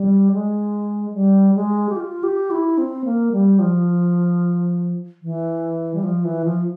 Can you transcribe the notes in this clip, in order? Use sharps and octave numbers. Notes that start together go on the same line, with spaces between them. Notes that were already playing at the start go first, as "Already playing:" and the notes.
Already playing: G3
G#3
G3
G#3
G4
F4
G4
E4
C4
A#3
G3
F3
E3
G3
F3
E3
F3